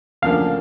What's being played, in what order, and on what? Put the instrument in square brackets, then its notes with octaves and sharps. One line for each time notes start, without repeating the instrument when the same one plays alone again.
[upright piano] D2 C#3 F3 A#3 D4 [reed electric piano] F5